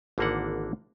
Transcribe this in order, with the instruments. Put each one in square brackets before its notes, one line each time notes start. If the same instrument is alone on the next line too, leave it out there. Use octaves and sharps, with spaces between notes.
[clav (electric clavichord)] G#1 D3 E3 A#3 D4 F#5